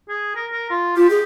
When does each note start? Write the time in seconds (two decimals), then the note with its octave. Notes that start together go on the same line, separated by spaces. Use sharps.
0.09 G#4
0.36 A#4
0.52 A#4
0.70 F4
0.96 F4 G4
1.10 G#4